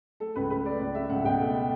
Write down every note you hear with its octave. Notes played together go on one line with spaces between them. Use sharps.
A3 A4
C#2 B4
A3 B4
A3 D5
C#2 D5
A3 E5
C#2 F#5
B2 G5
A3